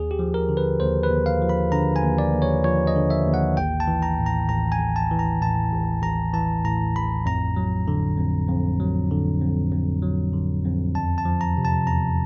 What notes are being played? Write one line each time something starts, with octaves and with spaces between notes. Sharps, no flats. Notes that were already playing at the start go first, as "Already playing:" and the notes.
Already playing: D#2 G#4
G4
F3
A#4
D3
B4
D#2 C5
B4
D#2
F5
F3
B5
D3 A#5
G#5
D#2
D5
D#2
C#5
F3 C#5
D#5
D3
E5
D#2
F#5
A1 G5
A5
E3
A#5
A2
A#5
A1 A#5
G#5
A1
A5
E3
A#5
A2 A5
A1
A1 A#5
E3 A5
A2 A#5
A1 B5
F2 A#5
F#3
D3
F2
F2
F#3
D3
F2
F2
F#3
D3
F2
E2 A5
A5
F3
A#5
C3
A5
E2 A#5